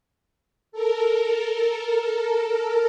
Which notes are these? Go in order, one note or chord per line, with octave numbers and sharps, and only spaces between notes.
A4 A#4